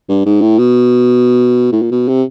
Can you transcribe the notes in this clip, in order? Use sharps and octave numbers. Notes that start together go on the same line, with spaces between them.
G2
G#2
A2
B2
A2
A#2
B2
C3